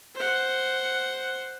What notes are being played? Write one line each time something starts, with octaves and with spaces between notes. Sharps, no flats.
C5 F#5